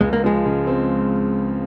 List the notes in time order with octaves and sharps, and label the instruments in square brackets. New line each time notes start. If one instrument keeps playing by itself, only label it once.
[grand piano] C#2 [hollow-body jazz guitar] G#3
[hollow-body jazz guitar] A#3
[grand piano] F3 [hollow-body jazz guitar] G#3
[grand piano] C#3
C4